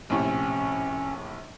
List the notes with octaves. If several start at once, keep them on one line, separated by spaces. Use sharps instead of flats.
A#1 A2 C3 C#4